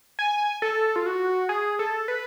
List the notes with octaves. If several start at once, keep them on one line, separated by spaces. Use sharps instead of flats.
G#5
A4
F4
F#4
G#4
A4
B4